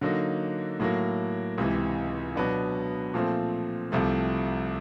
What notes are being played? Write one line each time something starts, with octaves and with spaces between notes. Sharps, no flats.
D3 F#3 A#3 D#4
A2 F#3 A#3
C#2 C3 E3
B2 F#3 B3 D4
A#2 F3 A3 C4
C2 C3 F3 A3